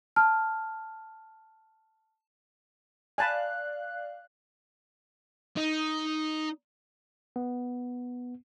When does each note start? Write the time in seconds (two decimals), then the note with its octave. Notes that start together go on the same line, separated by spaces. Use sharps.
0.16 A5 F6
3.18 D5 F5 G#5 A5 B5 F#6
5.57 D#4
7.36 B3